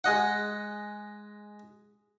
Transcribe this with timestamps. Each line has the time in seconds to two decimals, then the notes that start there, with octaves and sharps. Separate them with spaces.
0.04 G#3 D#5 F#5